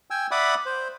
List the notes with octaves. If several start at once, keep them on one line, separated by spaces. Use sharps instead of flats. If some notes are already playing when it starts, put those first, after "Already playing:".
G5 G#5 E6
D5 E5 F#5 B5 D6 D#6
C5